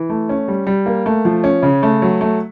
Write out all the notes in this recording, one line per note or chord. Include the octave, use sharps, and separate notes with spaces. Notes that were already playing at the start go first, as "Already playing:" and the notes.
Already playing: E3
A3
C#4
G3
G3
A#3
A3
F3
C#4
C#3
A3
F#3
A3